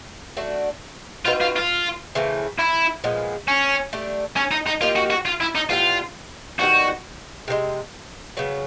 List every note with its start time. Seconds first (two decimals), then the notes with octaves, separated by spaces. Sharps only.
0.37 A3 D4 F#4
1.25 C4 D#4 F4 F#4 B4
1.41 F4
1.56 F4
2.15 C#3 E3 A3 C4
2.59 E4
3.04 A#2 F3 G#3 B3
3.48 C#4
3.93 A3 D4 G4
4.37 C#4
4.51 D#4
4.66 D#4
4.81 A#3 D#4 F4 G4 A#4
4.96 F#4
5.10 F#4
5.26 F4
5.41 E4
5.55 D#4
5.69 A2 E3 G3 B3 F4
6.59 D#3 G3 B3 D#4 F#4
7.48 C3 D#3 G#3
8.37 C#3 F#3 B3